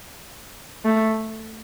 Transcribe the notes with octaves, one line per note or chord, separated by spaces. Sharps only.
A3